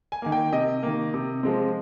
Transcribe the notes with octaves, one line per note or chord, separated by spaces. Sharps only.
G#5
D#3 A#3 G#5
G5
C3 D#5
D#3 A#3
C3
F3 G#3 C4